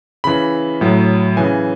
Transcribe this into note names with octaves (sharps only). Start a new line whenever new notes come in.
C#3 E3 B5
A2 F#3
C#3 E3 G#5